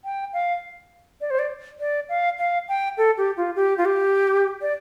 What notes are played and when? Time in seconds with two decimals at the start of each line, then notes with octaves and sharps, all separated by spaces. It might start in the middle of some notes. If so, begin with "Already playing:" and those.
0.04 G5
0.33 F5
1.21 D5
1.30 C5
1.39 D5
1.80 D5
2.09 F5
2.38 F5
2.68 G5
2.98 A4
3.18 G4
3.37 F4
3.56 G4
3.78 F4
3.85 G4
4.62 D5